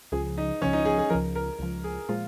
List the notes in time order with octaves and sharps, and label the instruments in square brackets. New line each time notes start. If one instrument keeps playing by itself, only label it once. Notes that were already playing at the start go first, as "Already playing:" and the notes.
[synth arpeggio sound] C#2 C#3 F3 [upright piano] G#4
[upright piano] D#4
[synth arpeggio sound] C#2 C#3 F3 [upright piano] C#4
[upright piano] D#4
G#4
G#4
[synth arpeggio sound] C#2 C#3 F3 [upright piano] A#4
[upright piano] A#4
[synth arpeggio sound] C#2 C#3 F3
[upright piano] G#4
[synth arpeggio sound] A#2 F3 G#3 [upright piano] F4